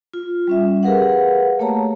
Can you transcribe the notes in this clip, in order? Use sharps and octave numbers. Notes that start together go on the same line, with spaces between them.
F4
G3 C#4 E5
G4 G#4 A#4 B4 F5 F#5
A3 A#3 C#5 A5 A#5